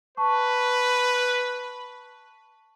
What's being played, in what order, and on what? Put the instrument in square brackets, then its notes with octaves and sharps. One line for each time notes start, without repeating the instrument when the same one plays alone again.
[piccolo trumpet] B4 [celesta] A5 C#6